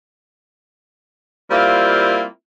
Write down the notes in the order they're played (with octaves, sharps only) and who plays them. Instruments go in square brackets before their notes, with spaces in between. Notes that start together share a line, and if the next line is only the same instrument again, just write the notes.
[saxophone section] G3 A#3 C4 E4 F4